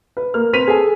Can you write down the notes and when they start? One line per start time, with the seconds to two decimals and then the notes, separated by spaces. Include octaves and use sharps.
0.17 B4
0.34 A#3 F6
0.53 C4 B4 B6 D#7 F7
0.67 G#4 A4 G#5